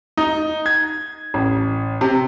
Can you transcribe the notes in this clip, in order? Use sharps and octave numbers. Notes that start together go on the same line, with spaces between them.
D#4
G#6
A1
C3